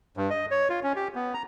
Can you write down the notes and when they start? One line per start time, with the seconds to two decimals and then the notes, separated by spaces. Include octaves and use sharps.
0.17 G2
0.30 D#5
0.51 C#5
0.70 F4
0.83 C#4
0.96 G4
1.15 B3
1.34 A#5